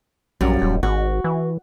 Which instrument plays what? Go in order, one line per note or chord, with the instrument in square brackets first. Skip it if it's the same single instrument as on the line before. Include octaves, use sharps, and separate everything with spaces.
[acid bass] A#1 [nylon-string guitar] F#2 G3
[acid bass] D#1
[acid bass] G#1 [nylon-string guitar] F#4
[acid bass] E3